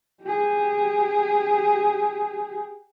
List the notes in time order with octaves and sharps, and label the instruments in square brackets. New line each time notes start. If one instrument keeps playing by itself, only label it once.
[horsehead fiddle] G4 G#4